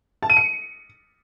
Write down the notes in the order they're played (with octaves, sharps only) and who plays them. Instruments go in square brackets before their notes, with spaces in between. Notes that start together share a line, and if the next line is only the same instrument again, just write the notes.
[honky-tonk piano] A5
D#7
C#7